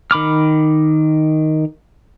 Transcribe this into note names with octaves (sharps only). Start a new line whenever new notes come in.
D#3 B5 D6 F6